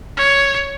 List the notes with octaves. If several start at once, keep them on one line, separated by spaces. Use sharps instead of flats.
C#5